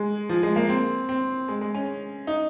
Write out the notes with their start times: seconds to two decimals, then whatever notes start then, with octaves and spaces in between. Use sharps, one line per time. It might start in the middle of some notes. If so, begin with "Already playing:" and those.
Already playing: G#3
0.29 F3
0.43 G#3
0.56 A#3
0.69 C4
1.09 C4
1.49 G#3
1.61 G#3
1.74 C#4
2.27 D#4